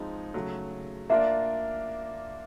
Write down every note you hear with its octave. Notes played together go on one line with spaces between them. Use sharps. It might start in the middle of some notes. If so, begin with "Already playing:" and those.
Already playing: F3 G#3 C4 D#4
C#3 F#3 A3
A#3 D4 F4 A#4 D5 E5